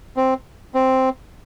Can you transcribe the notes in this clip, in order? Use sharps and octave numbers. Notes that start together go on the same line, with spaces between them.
C4
C4